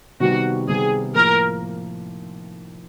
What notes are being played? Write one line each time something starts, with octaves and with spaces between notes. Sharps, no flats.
C3 D#3 G3 B3 F#4
C3 D#3 G3 B3 G#4
A2 F3 A#3 A#4